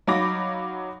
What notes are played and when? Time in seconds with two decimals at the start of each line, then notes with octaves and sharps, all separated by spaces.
0.07 F#3 D#4 F5 B5 D6 A#6